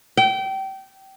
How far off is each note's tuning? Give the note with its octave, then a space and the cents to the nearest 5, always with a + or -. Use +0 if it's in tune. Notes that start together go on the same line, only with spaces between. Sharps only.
G5 -25